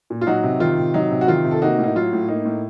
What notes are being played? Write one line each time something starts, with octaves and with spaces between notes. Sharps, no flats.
A#2
F4
F#3 D#4 F#4
C3
D#3 F4
C3
F#3 D#4
C3
F#4
D#3 F4
C3
A4
A#3 D#4 F#4
A2
D#4
F#3 F4
A2
A#3 D#4
A2